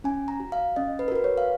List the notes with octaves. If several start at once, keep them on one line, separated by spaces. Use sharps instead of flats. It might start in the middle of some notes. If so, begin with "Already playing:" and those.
C#4 G#5
A#5
F#4
F5
C#4 D#5
B4
A#4
F#4 B4
C#5
F5